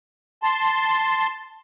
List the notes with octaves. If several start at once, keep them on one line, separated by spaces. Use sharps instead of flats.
A5 C6